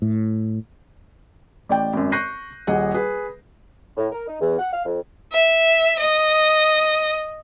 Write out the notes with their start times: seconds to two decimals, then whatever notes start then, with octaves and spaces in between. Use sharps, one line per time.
0.02 A2
1.69 A1 D5 G5
1.93 G#1 F#2
2.12 C#6 F#6 G6 A#6 C7 D#7
2.67 D#1 G#4 D#5 F#5
2.94 G#4 B4
3.97 A2
4.12 A#4
4.28 D#4
4.41 E2
4.58 F#5
4.73 F5
4.86 F2
5.32 E5
6.00 D#5